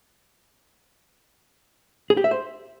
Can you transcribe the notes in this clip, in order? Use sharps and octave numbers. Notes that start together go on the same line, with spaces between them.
G#4
G4
E5
C5